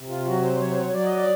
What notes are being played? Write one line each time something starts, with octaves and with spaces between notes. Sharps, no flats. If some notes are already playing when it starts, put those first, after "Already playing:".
Already playing: C3
F4
F#3 F#4
C5
F#3 C#5
C5
C#5
F#3 D5
D#5
D5